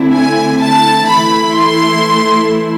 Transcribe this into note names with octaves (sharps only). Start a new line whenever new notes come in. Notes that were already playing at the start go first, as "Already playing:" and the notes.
Already playing: D3 A3 C4 E4
G#5
A5
E3 A3 E4 B5
C6